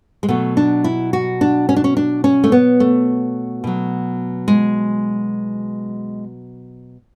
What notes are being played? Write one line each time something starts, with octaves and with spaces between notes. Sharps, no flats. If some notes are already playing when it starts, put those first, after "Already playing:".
G#3
B2 F#3 A3
D4
E4
F#4
D4
C#4
D4
C#4
D4
C#4
A3
B3
A3
B2 F#3
G#3